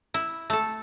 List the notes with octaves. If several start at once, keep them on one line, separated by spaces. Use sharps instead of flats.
E4
A3 A4